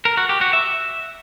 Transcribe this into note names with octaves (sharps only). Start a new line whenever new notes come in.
A#4
F#4
G4
F#4
E5